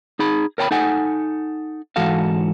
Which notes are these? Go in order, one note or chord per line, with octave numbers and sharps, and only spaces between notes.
D#4 G#4 B5
A#4 C#5 G5 A#5 B5
D#4 A4 F#5 G#5
G#2 E3 F#4 A4 F5